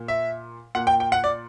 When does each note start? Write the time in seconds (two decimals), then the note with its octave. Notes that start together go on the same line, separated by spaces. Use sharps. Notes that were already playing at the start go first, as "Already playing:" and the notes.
Already playing: A#2
0.08 E5
0.75 A#2 F#5
0.87 G5
1.00 G5
1.12 F#5
1.24 D5